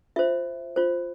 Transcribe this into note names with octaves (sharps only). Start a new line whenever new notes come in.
F4 C5 E5
F4 C5